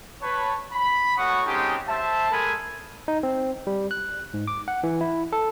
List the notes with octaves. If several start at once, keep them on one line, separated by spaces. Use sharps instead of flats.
B4 C#5 A5
B5
A3 F#4 C#5 F#5 C#6 D#6
G#3 C4 C#4 D#4 G4 A4
C5 E5 A5
G#3 A3 A4 A#4 G#5 B5
D#4
C4
G3
F#6
G#2
D6
F#5
E3
E4
A4